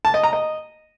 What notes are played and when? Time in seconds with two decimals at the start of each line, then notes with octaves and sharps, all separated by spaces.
0.05 A5
0.14 D#5
0.23 A#5
0.33 D#5